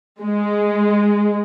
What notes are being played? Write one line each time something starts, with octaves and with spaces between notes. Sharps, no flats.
G#3